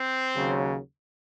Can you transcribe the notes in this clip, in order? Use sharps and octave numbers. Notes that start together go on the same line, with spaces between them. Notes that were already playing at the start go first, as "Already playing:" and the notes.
Already playing: C4 C5
D#2 C#3 F#3